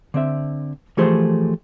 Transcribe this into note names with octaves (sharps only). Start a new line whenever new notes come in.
D3 C4 E5
E3 F3 A3 G4 G#4 C5